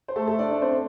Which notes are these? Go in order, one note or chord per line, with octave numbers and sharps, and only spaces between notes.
C5
A3 A4
A3 A4
D4 D5
D4 D5
C4 C5